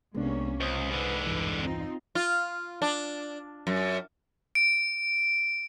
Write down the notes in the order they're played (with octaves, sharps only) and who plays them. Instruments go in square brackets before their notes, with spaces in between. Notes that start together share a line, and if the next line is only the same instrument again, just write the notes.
[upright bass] C2 [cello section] C3 A#3 C#4 [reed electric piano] G#3 B3 D4
[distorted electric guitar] C#2 [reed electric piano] C5 D#6
[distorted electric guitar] G#2 D3 [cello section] B4
[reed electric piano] E2 G2 E3
[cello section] C4 D#4 F4
[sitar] F4
D4
F#2
[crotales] D7